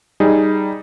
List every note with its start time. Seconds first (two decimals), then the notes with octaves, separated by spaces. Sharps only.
0.20 G3 D#4 G#4